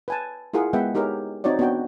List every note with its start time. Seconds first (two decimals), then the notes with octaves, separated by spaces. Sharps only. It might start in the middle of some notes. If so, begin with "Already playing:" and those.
0.08 B4 G#5 A5
0.54 E4 F4 G#4 A#4 F#5
0.73 G#3 B3 B4 E5 F#5 G5
0.95 D#4 G4 G#4 A#4 B4 C#5
1.44 C4 D#4 F#4 C#5 D5
1.59 B3 D4 F#4 G5